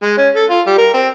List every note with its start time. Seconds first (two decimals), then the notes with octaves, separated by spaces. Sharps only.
0.03 G#3
0.17 C#4
0.36 A4
0.50 F4
0.67 G3
0.78 A#4
0.94 C4